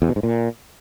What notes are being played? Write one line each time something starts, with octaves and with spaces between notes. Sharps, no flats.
E2
B2
G#2
A#2